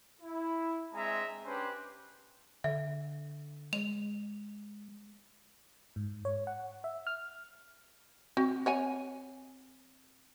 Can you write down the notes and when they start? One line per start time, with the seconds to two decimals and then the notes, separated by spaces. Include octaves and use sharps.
0.21 E4
0.94 G#3 C4 D4 E5 G#5 A#5
1.45 C#4 D4 G4 B4 C5
2.64 D3 E5
3.73 G#3 F7
5.96 G#2
6.25 C#5
6.47 F#5
6.84 E5
7.07 F6
8.37 C4 F#4
8.66 C#5 F#5 G#5